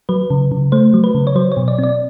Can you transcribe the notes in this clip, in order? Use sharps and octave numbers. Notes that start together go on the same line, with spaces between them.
F#3 B4
C#3
C#3
A3 C5
F#3
B4
C#3
C#5
F#3 C5
C#5
B2
D5
C4 D5